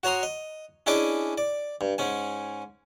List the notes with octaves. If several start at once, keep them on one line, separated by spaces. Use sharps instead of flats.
F#4 C#5 A#5 C6 D#6
D#5
C#4 D4 E4 G#4 D#5 D6
D5
G2
G#2 C#4 G#5